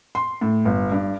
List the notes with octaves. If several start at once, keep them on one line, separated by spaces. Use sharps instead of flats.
C6
A2
G1
G2